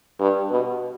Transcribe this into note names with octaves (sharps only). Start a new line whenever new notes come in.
G2
B2